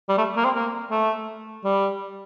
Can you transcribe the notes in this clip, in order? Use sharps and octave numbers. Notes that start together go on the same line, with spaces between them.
G3
A3
A#3
C4
A#3
A3
G3